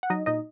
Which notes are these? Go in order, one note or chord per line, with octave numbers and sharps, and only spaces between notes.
F#5
F#3 D#4 D#5
A#2 D#4 D#5